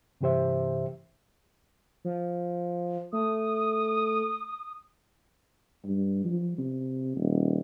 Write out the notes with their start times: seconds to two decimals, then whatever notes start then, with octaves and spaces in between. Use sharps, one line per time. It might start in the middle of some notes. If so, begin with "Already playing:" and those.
0.21 G2 C3 E3 G4 C5 E5
2.04 F3
3.13 A3 D#6
5.84 G2
6.25 F3
6.58 C3
7.16 D#1